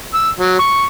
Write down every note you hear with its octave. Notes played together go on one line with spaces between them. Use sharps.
E6
F#3
C#6